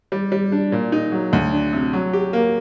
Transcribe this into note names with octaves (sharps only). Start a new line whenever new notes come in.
G3
G3
D4
A#2
D#4
F#3
D2
D4
C3
F#3
G4
A#3